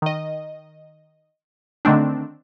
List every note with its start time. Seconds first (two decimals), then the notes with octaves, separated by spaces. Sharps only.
0.02 D#3 D#5
1.85 D3 D#3 A3 C4 D4